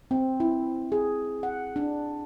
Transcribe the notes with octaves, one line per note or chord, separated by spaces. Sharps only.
C4
E4
G#4
F#5
D4